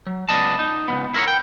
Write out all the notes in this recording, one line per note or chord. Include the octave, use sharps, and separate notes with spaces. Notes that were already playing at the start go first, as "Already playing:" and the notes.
F#3
C#2 G3 B3 D5 D#5 A5
D#4
C#2 F3 B3
E4 A#4 C5 C#5
G5